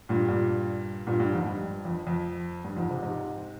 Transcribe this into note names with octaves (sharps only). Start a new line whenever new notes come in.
G2 A#2
G2 A#2
G2 A#2
G2
F2 G#2
G2
F2
F2
G2
F2 G#2
G#2 C3
G#2 C3